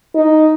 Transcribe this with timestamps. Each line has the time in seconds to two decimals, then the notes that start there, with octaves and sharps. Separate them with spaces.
0.15 D#4